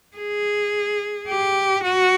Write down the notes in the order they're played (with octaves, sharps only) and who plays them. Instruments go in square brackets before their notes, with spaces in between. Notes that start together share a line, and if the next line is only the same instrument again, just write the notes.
[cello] G#4
G4
F#4